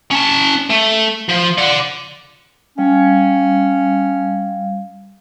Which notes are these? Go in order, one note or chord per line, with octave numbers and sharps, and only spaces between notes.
C#4 A5
A3
F3
D5 F#5
G3 C#4 F5